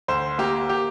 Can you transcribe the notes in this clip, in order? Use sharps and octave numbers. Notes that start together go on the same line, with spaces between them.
D2 C5
A#3 G4
G4